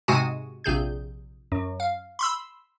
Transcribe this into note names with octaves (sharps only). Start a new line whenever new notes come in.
G#2 C3 G#3 F#4 G#5
A#1 C3 G#4 G6
F#2
F5
B5 C6 E6